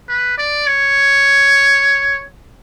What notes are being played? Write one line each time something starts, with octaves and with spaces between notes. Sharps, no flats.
B4
D5
C#5